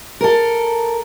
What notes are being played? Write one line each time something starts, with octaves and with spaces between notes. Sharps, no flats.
A4 A#4